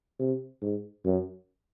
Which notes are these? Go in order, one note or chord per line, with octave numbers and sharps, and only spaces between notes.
C3
G#2
F#2